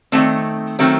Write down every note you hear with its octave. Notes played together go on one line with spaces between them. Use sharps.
D#3 F#3 A3 C4
D#3 F#3 A3 C4